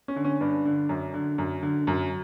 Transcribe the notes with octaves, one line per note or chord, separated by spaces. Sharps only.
C#4
D3
C#4
G2 D4
D3
F#2
D3
F#2
D3
F#2